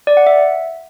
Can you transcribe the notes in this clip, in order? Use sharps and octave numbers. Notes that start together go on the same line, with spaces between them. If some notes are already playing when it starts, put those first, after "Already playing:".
D5
F#5
E5